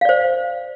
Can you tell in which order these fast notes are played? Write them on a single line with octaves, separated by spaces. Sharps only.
F5 D5 C5